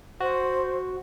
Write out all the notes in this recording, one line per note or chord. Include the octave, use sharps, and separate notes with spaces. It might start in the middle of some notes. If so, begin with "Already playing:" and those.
F#4 C5